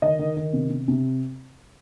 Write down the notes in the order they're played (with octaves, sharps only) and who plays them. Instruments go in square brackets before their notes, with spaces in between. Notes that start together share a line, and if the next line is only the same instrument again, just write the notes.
[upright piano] D#3 D#5
D#3
D#3
C3
C3
C3